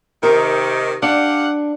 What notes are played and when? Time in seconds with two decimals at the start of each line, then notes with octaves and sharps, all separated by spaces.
0.23 C3 D#3 A#4
1.03 D4 G4 F5 F#5